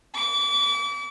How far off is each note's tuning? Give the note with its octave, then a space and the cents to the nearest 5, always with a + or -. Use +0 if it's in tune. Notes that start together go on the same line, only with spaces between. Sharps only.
D6 -35